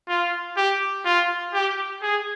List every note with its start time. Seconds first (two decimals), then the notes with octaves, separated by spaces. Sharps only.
0.08 F4
0.57 G4
1.05 F4
1.54 G4
2.02 G#4